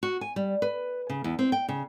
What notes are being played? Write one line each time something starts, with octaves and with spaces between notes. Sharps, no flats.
F#4
G#5
G3
B4
C#3
E2
C4
G5
C#3